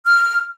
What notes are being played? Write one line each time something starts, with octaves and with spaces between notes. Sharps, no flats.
F6